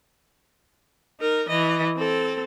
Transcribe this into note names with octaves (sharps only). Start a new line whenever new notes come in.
D#4 A#4
E3 D#5
C4 A4